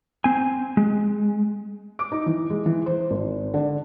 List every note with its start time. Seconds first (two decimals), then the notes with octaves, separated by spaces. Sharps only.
0.24 C4 G#5
0.77 G#3
1.99 D6
2.12 D#4
2.26 E3
2.50 G#3
2.66 E3
2.86 C5
3.11 G#1
3.54 D3